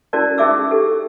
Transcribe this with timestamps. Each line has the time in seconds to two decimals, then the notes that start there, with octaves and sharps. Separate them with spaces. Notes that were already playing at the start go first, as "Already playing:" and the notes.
0.13 C#4 E4 F#4 A#4 D5 A5
0.38 C#4 D#4 G#4 E5 D6 E6
0.71 G4 A4